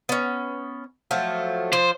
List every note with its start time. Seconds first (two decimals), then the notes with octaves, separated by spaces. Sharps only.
0.09 B3 C#4
1.11 F3 F#3 A3
1.73 F3 C5